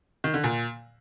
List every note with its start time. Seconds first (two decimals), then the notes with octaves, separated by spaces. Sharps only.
0.24 D#3
0.34 D3
0.44 A#2